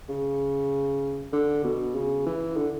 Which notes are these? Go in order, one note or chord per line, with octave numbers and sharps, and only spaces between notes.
C#3
D3
B2
C#3
E3
D3